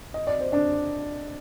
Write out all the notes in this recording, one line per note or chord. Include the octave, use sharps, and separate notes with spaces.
D#5
D5
C5
D4 D5